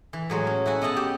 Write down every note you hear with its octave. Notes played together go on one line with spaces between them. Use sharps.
E3
A2 F#3 G#3
C#4
E4 F#4 G#5
B3 D#5 E5 F#5 A5
G4